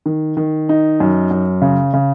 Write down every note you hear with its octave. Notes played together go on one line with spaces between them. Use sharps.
D#3
D#3
D#4
F#2
F#2
C#3
C#3